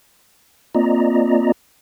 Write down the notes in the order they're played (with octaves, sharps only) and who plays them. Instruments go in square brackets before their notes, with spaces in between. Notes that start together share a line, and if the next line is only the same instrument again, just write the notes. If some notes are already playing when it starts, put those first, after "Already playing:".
[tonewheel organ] A#3 C4 F4 D5 D#5 A#5